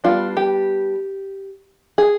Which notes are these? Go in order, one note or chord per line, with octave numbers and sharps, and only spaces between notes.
G3 B3 D4 F4
G4
G#4